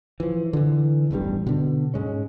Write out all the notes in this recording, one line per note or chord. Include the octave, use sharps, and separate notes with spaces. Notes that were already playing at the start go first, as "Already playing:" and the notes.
E3 F3
D3 E3
E1 A1 G2 G3
B2 D3
G#2 G#3 C#4